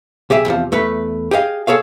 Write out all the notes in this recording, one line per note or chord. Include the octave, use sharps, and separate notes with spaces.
B1 G4 G#4 E5
E2 C3 F3
E2 A3 B4
G4 G#4 D#5 F5
G#4 A4 C#5 F5